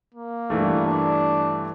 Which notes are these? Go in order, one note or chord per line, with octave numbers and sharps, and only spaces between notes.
A#3
G2 E3 A3
D4